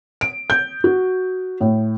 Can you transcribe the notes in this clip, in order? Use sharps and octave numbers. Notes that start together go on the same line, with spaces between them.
D7
G6
F#4
A2